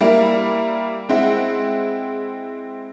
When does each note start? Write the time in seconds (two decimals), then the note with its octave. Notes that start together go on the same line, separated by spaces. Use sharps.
0.01 G3 A#3 E4
1.09 G#3 C4 E4 F#5